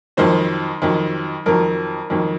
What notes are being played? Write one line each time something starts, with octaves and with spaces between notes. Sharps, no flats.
F2 D#3 F#3 C5
F2 D#3 F#3
F2 D#3 F#3 A#4
F2 D#3 F#3